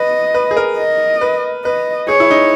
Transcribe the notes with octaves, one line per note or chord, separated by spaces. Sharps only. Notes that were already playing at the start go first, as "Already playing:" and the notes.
Already playing: B4 D#5
B4
G#4
A#4
D#5
B4
B4 D#5
G#4 C#5
E4
D#4